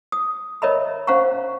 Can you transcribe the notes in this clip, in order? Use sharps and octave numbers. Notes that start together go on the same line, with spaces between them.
D#6
A#4 C#5 D#5 E5 A#5 B5
C#4 C5 F5 F#5 A#5 C#6